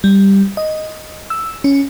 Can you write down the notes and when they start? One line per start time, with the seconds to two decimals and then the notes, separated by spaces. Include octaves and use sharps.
0.04 G3
0.57 D#5
1.30 E6
1.64 C#4